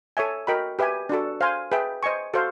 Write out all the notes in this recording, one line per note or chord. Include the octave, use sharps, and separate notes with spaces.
A4 C#5 E5 G#5
F#4 A#4 D#5 G5 B5
G4 B4 E5 G#5
D4 F#4 A4
C5 F5 G#5 C6
G#4 B4 E5 G5
C5 D#5 G#5 C#6
F#4 A4 C5 F5